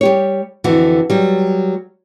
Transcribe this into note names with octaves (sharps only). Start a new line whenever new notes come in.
G3 G4 C#5
F2 D3 E3 F#4
F#3 G3